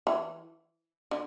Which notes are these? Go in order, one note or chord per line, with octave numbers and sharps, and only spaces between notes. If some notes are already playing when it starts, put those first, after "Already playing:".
E3
D3